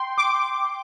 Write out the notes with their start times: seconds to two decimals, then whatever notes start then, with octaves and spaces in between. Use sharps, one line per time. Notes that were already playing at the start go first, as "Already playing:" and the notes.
Already playing: G5 C6
0.18 D6